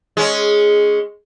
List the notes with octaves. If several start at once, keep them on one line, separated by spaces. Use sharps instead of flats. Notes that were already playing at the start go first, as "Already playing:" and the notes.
G#3 C#4